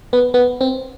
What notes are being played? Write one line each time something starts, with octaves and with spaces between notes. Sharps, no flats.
B3
B3
C4